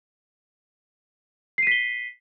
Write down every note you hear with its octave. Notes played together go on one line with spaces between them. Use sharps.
B6 C7 D#7 G7